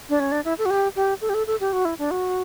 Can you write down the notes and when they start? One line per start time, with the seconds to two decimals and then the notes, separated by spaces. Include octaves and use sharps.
0.09 D4
0.20 C#4
0.32 D4
0.45 E4
0.58 A4
0.65 F#4
0.70 G4
0.96 G4
1.21 A4
1.29 G4
1.34 A4
1.47 A4
1.60 G4
1.73 F#4
1.85 E4
1.99 D4
2.11 F#4